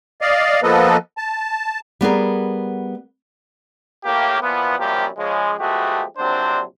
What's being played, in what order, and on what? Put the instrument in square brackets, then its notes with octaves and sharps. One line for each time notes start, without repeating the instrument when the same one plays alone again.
[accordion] D5 D#5 F5
F3 A#3 B3 A4 B4 D#5
A5
[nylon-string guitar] G3 B3 G#4 A#4
[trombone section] A2 A#3 G4
A#2 E3 F3 B3
F#2 C3 F3 G3 A#3 G4
C#3 F3 G#3
F3 G#3 A3 B3 F#4 G4
A#1 C3 F#3 C4 D4 C5